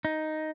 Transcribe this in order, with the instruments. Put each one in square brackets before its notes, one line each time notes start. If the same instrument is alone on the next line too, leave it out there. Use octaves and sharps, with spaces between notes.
[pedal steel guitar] D#4